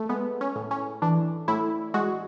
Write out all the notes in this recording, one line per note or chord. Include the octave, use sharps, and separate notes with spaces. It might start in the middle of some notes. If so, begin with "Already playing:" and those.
Already playing: A3
G#3 B3
C#4
A2
C#4
E3 D4
A2 E4
G#3 F#4